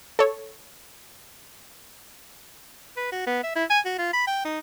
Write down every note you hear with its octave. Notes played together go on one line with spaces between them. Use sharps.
A4 C#5
B4
F#4
B3
E5
E4
G#5
F#4
F4
B5
G5
D#4